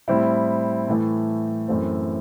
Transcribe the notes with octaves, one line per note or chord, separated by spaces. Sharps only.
A2 G3 C4 E4
A2 E3 A3
F#2 E3 A3 C4